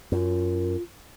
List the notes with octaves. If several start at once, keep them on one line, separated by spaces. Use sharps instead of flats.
F#2 F4